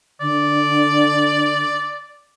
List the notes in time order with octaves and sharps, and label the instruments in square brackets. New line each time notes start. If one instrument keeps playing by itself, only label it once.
[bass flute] D3 [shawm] D5